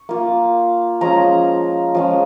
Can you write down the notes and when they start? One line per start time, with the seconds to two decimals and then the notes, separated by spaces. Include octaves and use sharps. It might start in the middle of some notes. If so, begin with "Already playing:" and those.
Already playing: C#6
0.09 A#3 F4
1.01 F3 G#3 C#4 A#5
1.95 F3 G#3 C#4